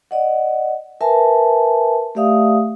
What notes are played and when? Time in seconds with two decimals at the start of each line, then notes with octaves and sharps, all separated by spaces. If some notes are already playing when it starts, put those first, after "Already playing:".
0.11 D5 D#5 F#5
1.01 A#4 B4 E5 G#5 A5
2.15 A3 G4 D5 E5 F5 D#6